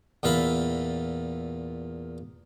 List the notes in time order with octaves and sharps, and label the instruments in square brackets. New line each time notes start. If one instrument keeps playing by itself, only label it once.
[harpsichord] E2 A#2 F4 E5 B5